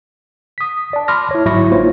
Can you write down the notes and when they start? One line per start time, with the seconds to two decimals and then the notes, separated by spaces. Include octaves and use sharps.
0.58 D#6 B6
0.93 D5 A5
1.08 B5 C6 D6 F6 A#6
1.31 E4 C#5
1.45 G1 G#2 F#3 E4 C#6 A#6
1.71 A#3 D#4 F4 C5 C#5